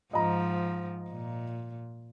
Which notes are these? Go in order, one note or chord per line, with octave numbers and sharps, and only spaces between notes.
G#2 F3 D#5 A#5
A#2